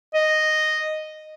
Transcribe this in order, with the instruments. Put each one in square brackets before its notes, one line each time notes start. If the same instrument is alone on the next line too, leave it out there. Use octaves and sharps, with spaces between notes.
[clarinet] D#5